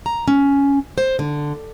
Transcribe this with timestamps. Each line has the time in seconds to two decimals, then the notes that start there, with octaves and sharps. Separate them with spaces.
0.06 A#5
0.28 C#4
0.98 C5
1.19 D3